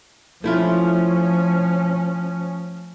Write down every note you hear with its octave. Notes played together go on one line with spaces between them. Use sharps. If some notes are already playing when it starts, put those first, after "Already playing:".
F3 A3 C#4 E4 F4